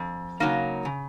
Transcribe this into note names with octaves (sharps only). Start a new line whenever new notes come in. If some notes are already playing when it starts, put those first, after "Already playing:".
Already playing: F2
C#3 F#3 A#3 D#4
C#3